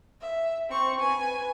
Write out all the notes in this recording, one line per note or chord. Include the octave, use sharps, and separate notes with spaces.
E5
C4 C#6
B4 G#5